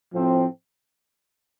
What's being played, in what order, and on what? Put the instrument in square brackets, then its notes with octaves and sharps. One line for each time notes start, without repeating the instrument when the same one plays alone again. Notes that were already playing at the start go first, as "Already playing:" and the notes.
[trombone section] A2 F3 C4